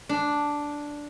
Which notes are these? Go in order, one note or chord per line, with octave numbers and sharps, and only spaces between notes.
D4